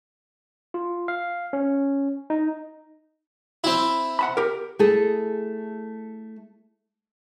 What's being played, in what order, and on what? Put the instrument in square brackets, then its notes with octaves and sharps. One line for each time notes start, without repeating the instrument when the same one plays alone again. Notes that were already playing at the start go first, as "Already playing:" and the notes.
[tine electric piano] F4
F5
C#4
D#4
[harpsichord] C4 E4
[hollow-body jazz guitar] F#5 A5 B5
G4 A#4
[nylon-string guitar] A3 E4 G#4 A4